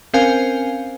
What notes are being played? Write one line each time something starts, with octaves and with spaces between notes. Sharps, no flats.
C4 C#4 A#4 C5 F5 G#5